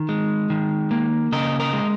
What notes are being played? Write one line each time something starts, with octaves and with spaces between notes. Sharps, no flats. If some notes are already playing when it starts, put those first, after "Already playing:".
Already playing: D#3
G#3
D#3
A#3
C#3 A#4 D#5
A#4 D#5
G#3